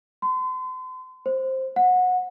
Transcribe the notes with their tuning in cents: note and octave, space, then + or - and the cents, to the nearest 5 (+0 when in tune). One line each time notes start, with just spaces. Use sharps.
C6 -40
C5 +10
F#5 -20